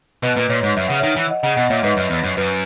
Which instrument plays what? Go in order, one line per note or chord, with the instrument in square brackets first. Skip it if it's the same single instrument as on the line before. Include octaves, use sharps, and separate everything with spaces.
[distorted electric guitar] B2 [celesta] B4 D#5
[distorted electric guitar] A#2 [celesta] B4
[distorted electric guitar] A#2 [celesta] C#5
[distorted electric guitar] G#2 [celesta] C#5
[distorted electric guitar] F#2 [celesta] E5
[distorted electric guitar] C#3 [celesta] F#5
[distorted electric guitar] D#3 [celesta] C#5 E5
[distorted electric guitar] E3
[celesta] D#5 F#5
[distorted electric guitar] C#3 [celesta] D#5 F#5
[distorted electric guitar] B2 [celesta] D#5 F#5
[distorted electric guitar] A#2 [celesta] C#5 E5
[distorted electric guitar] G#2 [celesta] B4 D#5
[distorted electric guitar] F#2
E2
F#2
[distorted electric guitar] F#2 [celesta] B4